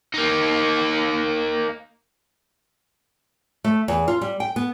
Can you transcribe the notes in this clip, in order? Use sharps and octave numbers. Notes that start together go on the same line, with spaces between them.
A#3 D#4
A3
E2
F4
G3
G5
B3